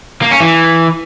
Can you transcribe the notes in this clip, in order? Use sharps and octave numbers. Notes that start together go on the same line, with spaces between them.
A#3
C#4
E3